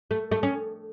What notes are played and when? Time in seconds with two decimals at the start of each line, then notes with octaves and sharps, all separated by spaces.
0.11 A3
0.31 A3
0.43 C#4